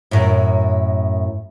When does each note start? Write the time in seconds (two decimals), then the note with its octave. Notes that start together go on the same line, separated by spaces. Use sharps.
0.11 F#2 A2